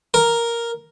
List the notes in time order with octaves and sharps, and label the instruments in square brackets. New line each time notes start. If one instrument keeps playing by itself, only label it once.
[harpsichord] A#4